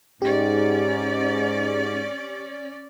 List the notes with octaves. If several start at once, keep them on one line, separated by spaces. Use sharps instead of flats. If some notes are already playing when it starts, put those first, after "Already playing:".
G#2 C#4 G4 D5